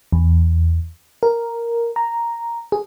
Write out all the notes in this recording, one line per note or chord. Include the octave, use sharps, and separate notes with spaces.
E2
A#4
A#5
G#4